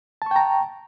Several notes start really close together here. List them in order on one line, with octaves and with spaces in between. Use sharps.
A5 C#6 G5 A#5